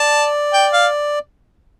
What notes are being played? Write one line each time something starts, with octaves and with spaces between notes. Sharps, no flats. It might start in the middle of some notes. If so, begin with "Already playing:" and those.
Already playing: D5 A5
G5
F5